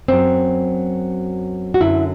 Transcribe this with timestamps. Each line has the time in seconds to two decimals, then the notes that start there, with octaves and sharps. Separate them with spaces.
0.08 F#2 F#3 C4
1.74 F#4
1.81 F#2 D3 F#3 E4